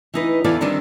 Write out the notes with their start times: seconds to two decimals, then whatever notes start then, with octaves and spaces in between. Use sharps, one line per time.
0.14 E3 D#4 B4
0.44 E2 E3 A4 D5 F5
0.61 D3 D#3 G3 C4 D4 D#4